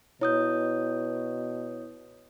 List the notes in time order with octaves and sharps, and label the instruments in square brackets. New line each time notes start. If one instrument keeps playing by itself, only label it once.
[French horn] B2 [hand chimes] E4 D#6 G6 [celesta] C#5